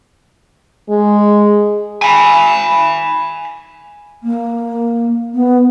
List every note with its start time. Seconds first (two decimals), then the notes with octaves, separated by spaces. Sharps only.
0.89 G#3
2.02 G#5 B5
4.23 A#3
5.34 B3